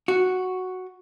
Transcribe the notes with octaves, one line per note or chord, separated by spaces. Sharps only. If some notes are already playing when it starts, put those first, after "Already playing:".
F#4